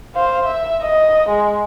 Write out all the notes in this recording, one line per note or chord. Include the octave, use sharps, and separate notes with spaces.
C5 F5
E5
D#5
G#3